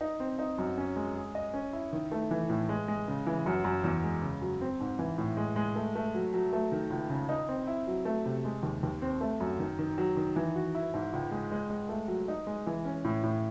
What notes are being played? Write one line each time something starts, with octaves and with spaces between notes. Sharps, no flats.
D#4
C4
D#4
F#2
C#4
G#3
G#4
D#5
C#4
E4
D#3
A3
E3
A2
G#3
G#3
C#3
E3
F#2
F#2
E2
G#3
C#3
F#3
C4
G#2
E3
A2
G#3
G#3
A3
A3
F#3
F#3
A3
D#3
C#2
C#3
D#4
C4
E4
F#3
A3
C3
G#3
D#2
D#2
C4
A3
F#2
D#3
D#3
F#3
D#3
E3
F#4
E4
G#2
C#2
G#3
G#3
G#3
A3
F#3
D#4
G#3
E3
C#4
A2
A2